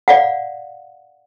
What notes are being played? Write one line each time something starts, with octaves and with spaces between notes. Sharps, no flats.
D5 F5 F#5